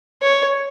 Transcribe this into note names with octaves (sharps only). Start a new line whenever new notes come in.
C#5